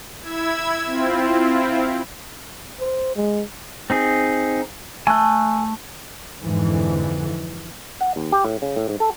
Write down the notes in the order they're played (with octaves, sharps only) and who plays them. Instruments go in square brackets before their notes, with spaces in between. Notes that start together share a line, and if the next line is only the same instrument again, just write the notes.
[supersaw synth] E4 E6 G#6
C4 E4 F4
[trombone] C5
G#3
[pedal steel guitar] C4 D#4 G#4
[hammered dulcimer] A3 [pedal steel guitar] G#5 F#6
[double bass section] F2 G#2 D3 E3
[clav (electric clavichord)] F#5
D#2
G4
A2
C#3
A2
G#2
A4